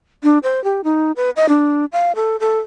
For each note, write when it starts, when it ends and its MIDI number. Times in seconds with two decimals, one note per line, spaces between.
0.23 0.38 62
0.43 0.63 72
0.64 0.81 67
0.84 1.12 63
1.16 1.30 71
1.36 1.49 75
1.49 1.85 62
1.92 2.12 77
2.15 2.36 69
2.40 2.59 69